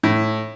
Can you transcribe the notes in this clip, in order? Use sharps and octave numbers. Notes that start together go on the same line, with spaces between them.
A2